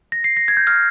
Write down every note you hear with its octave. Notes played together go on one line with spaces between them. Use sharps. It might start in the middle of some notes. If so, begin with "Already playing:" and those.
A#6
C7
A#6
G#6
G6
F6